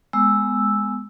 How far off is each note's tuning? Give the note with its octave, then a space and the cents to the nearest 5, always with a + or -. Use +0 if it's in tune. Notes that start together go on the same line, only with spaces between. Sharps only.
G#3 +0 B3 +0 E6 +0